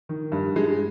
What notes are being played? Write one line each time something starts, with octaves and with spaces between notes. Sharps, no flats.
D#3
G2
G#3